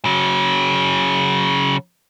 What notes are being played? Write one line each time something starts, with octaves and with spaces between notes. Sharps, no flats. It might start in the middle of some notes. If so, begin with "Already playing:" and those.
C#3 F#3